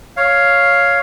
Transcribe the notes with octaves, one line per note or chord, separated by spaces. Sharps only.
C#5 F5